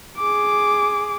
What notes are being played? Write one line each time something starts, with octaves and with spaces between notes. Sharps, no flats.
G#4 D6